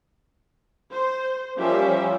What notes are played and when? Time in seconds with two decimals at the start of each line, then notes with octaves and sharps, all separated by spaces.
0.92 C5
1.58 F3 G3 A#3 C#4 G4 E5